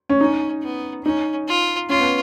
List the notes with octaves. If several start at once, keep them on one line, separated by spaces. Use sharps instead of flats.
C#4
C#4 D#4
B3
C#4 D#4
F4
C#4 F4
B3